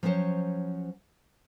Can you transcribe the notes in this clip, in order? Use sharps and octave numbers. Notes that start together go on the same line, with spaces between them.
F3 F#3 C#4 C5 C#5